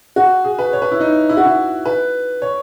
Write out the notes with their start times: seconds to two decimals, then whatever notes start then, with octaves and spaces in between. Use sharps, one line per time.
0.16 F#4
0.44 G#4
0.59 B4
0.73 C#5
0.82 B4
0.92 E4
1.00 D#4
1.29 E4
1.37 F#4
1.45 E4
1.85 B4
2.42 C#5